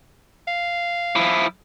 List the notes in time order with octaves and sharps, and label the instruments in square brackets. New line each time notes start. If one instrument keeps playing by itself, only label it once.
[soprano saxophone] F5
[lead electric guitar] F3 E4